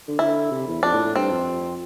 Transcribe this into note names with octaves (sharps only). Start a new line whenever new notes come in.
D3
D3 E4
C3
E2
F2 D4
A2
A2
G2 C4
F2